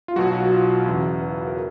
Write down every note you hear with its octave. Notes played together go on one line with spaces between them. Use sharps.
F4
B1 B2 F#3 F#4
F#4
F4
E2 C#3 E3 F#4
B4
A#4